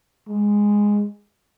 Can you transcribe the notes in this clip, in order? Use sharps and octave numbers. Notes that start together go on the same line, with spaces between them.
G#3